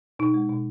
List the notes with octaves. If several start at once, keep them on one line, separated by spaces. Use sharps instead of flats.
B2 D#4
G#3
B2